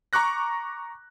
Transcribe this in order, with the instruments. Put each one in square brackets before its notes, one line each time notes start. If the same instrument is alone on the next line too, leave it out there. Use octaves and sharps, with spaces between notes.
[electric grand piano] A#5 C#6 D6 F#6 A#6